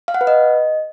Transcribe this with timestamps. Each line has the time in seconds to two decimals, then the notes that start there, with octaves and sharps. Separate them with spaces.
0.08 F5
0.14 F#5
0.21 B4
0.27 D#5